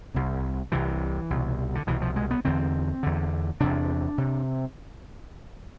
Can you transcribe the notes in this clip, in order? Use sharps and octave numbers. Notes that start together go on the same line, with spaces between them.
C2 C3
C2 C3 E3
C2 B2
D3
C2 B2 E3
F3
G#3
B3
E2 D3 C4
E2 D3
E2 C3 D4
C3